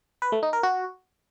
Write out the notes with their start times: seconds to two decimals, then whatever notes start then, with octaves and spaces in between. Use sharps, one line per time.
0.22 B4
0.32 A3
0.43 D#4
0.53 A#4
0.63 F#4